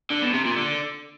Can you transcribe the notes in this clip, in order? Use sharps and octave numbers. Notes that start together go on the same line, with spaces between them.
D3
B2
C3
A#2
D3